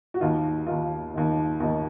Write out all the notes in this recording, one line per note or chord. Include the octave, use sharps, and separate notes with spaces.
F#4
D#2 D#3 F4
D#2 D#3 F4
D#2 D#3
D#2 D#3